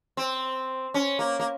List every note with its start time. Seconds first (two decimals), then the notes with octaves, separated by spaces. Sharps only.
0.17 C4
0.94 C#4
1.19 A#3
1.40 A#3